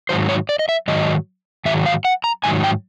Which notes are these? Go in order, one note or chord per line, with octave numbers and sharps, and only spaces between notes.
G#2 D#3 F#3 C5
C#5
D5
D#5
E5
G#2 D#3 F#3 D#5
G#2 D#3 F#3 E5
F5
F#5
A#5
G#2 D#3 F#3 G#5
G5